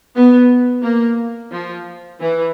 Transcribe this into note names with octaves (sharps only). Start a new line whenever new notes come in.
B3
A#3
F3
E3